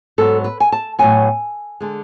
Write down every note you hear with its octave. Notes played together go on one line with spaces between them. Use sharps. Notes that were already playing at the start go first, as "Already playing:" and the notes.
G#2 F#3 B3 A4
B4
G#5
A5
A2 F#3 B3 G#5
D3 G#3